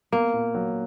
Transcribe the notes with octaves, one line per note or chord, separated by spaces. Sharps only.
A#3 B3
A#2
F#3